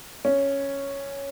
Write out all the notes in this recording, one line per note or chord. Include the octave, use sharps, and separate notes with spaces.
C#4